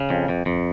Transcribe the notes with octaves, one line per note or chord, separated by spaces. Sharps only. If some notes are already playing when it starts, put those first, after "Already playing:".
Already playing: C#3
F2
F2
F2